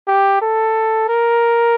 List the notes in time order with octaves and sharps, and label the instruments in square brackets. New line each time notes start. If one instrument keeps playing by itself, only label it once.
[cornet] G4
A4
A#4